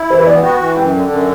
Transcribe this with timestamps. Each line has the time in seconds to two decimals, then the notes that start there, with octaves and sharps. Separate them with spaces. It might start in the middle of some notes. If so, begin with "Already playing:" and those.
Already playing: E4
0.10 E3 C5
0.19 B4
0.27 B3 D5
0.35 F#5
0.43 F#4 G5
0.60 E3
0.77 F#2 G5
0.93 D3
1.09 F#2